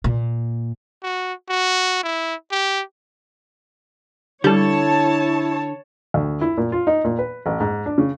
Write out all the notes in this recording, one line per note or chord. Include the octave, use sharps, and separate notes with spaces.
A#2
F#4
F#4
E4
G4
D3 G3 E4 A4 C#5 A5
D2
E4
A#2
F4
D#4
A#2
B4
A1
G#2
D4
C#3